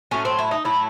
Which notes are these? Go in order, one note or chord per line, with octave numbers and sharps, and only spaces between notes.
A2 F#3 A3 C#4
C4
E4
D#4
A2 F#3 A3 E4